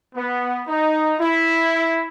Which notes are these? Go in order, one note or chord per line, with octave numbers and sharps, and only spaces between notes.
B3
D#4
E4